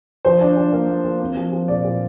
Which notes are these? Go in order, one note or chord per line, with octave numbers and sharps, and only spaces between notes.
F3 C5
D4
D4
A#3
A#3
A#3
C4
F3
F3
A#2 D5
A#2